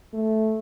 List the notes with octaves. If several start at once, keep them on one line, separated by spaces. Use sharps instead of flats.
A3